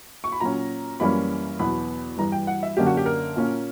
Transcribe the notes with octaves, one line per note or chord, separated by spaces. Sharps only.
C#6
B5
A#2 F#3 C#4 A#5
F#2 E3 G3 A#3 C#4 B5
E2 B2 F#3 B3 B5
G2 E3 G3 A#5
G5
F#5
E5
F#2 D3 A#3 C#4 G4
F#4
G4
A#4
A#2 A#3 C#4